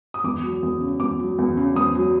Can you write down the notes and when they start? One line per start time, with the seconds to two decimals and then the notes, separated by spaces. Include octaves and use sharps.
0.14 D#6
0.24 E2 D6
0.43 F#3
0.63 E2
0.81 C#3
1.00 E2 D6
1.20 F#3
1.38 E2
1.57 C#3
1.75 E2 D#6
1.95 F#3